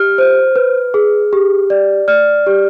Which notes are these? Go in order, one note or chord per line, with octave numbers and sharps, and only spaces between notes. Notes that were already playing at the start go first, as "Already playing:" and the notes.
Already playing: G4 F6
C5
B4
G#4
G4
D5
D5 F6
G4